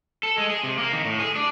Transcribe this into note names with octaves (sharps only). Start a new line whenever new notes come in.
A4
G#3
G#4
C3
A#3
D#3
A2
G#4
D4